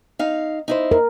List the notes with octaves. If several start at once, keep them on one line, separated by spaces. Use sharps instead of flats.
D#4 F5
D#4 E4 C5
A#4